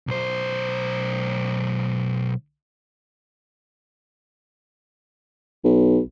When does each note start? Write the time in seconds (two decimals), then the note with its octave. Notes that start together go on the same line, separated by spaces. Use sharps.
0.07 B1 C5
5.64 B1